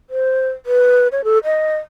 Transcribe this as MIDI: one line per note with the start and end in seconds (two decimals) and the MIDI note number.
0.10 0.50 72
0.66 1.08 71
1.12 1.24 73
1.24 1.38 69
1.44 1.77 75